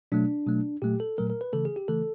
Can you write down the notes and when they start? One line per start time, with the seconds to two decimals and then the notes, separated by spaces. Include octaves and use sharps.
0.12 B2 F#3 A3 D4
0.47 B2 F#3 A3
0.82 A#2 F#3 A3 G4
1.00 A4
1.18 A#2 F#3 A3 A#4
1.30 A#4
1.41 B4
1.53 C#3 E3 A3 A4
1.65 G#4
1.76 G4
1.88 C#3 E3 A3 A4